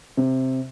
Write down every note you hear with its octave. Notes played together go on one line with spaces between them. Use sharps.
C3